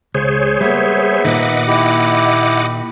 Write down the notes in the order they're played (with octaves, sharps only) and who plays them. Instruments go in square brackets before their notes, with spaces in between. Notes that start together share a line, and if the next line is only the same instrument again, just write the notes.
[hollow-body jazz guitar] C#2 [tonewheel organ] G#4 C5 C#5
[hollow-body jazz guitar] G3 A#3 [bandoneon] B3 E5
[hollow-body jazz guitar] A#2 D#3 [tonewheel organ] D#5 F#5 D6
[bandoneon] E4 G4